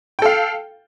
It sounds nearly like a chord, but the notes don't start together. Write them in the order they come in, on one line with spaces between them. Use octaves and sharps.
G5 A4 F5